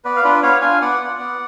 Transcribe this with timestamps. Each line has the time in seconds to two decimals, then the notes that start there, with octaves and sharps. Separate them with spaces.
0.04 B3 B4 D5
0.16 F5
0.23 D4 F4 B4 D5
0.43 B3 C#5 F5
0.62 D4 F4 F5 G#5
0.81 B3 D5 F#5
1.00 F4
1.19 B3